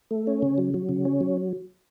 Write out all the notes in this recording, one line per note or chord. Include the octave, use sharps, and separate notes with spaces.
A3
C#4
C#3
F#3
F#3
C#3
C#4
F#3